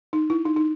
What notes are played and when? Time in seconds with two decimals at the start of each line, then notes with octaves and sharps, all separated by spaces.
0.13 D#4
0.30 E4
0.45 D#4
0.56 D#4